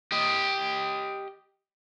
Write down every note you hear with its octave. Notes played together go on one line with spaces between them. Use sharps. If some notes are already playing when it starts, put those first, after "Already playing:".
G4 D#5